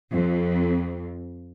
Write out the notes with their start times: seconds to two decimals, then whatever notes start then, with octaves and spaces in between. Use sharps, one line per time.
0.12 F2